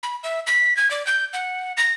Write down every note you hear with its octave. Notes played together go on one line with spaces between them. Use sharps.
B5
E5
B6
G#6
D5
G6
F#5
A#6